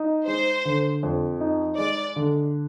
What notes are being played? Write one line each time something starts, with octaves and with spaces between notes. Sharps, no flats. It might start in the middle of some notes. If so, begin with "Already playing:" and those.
Already playing: D#4
G#3 C5
D3
F2
D#4
G#3 D5
D3